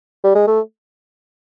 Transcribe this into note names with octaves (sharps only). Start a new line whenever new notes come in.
G3
G#3
A3